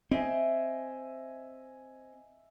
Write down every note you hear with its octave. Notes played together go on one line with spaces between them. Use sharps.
C4 D#5 E5 G#5